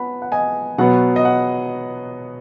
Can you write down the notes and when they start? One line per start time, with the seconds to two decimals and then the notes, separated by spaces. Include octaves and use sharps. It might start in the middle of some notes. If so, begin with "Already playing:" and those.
Already playing: B3 F#5 B5
0.22 F#5
0.32 D#5 G#5
0.78 B2 F#3 B3 F#5
1.16 D#5
1.25 F#5